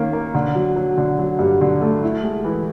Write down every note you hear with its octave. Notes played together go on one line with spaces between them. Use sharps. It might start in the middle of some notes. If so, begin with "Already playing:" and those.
Already playing: D#3 A#3 C#4
A#3
D3
F#3
F#3
D3
F#3
G2
D3
A3
E4
G#3
E3